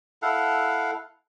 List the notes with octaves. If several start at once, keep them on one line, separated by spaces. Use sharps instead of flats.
E4 A4 F5 F#5